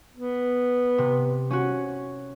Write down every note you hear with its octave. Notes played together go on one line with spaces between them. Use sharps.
B3
C3
C#4 F#4